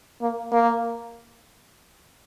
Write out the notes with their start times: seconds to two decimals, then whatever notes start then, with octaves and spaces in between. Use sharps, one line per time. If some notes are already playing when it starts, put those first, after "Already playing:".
0.22 A#3
0.53 A#3